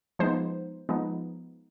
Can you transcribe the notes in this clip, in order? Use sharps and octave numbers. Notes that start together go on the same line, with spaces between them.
F3 G#3 B3 D#4 C5
F3 G#3 B3 D#4